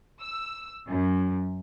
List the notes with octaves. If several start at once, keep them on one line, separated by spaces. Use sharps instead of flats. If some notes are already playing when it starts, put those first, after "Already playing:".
E6
F#2